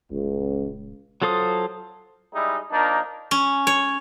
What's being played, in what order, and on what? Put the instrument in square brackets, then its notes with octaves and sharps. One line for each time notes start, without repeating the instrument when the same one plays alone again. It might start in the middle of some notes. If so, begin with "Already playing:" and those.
[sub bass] D#1 [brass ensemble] C#2
[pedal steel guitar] F#3 F4 A4 C5 D#6
[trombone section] G3 G#3 D#4 E4
F3 A#3 D4 D#4
[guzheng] C#4
C#5